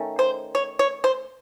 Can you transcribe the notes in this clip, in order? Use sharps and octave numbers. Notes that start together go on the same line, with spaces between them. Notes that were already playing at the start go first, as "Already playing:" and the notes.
Already playing: D#3 A3 C#4
C5
C#5
C#5
C5